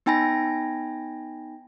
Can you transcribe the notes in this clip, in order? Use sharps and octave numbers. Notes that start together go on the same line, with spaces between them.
B3 D#4 G5 G#5 B5 A#6